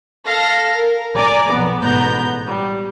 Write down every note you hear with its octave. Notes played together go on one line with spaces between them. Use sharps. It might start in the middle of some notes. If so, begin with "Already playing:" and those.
A4 F5 A5 A#6
A#4
D5 G#5 A#5 D6
B1 F2 B3
A1 G#2 B2 B3 A#5 G6
G3